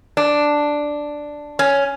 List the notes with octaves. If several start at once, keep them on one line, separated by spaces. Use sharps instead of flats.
D4
C#4